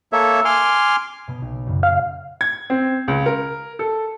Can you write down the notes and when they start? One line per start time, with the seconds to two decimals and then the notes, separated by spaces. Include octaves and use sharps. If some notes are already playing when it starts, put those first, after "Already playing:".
0.13 A#3 A4 C#5 E5
0.45 G#5 C6 D6 F6
1.28 B2 B3 D#6
1.42 B1
1.66 F#2 A#2 C#3
1.83 F5
2.41 G#6
2.70 C4
3.08 C#2
3.26 A#4
3.79 A4